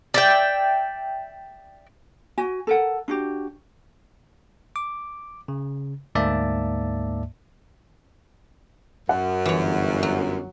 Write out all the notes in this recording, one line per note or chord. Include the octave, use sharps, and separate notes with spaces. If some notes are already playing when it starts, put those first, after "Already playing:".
D5 E5 G5
F#4 G#5
A4 A#4 F#5
D4 F#4 G4
D6
C#3
D2 G#2 A#3 D5 E5 A5
F#2 F#5
G1 E3 C#5
F#3